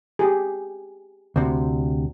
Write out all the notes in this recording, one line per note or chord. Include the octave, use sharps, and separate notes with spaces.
G4 G#4
D2 C3